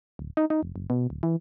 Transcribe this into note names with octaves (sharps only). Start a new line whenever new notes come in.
D1
D#4
D#4
F1
F#1
B2
D1
E3